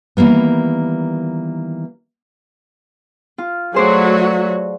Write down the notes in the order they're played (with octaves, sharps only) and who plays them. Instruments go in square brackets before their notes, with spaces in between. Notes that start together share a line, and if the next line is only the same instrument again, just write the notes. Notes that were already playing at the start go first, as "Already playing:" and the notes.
[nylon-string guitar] D#3 E3 G3 A#3 B3
[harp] F4
[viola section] F#3 A3 F#4 [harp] G#4 C5 D5